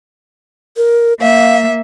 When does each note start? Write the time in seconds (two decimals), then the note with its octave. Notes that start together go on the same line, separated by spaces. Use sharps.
0.77 A#4
1.20 A#3 E5 F5